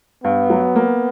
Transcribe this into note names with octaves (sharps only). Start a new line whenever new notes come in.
G2 B3
F#3
A#3